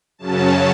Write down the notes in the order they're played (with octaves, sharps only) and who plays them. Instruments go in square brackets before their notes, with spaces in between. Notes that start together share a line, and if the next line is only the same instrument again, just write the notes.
[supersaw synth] F#2 C#3 F#3 C#4 A5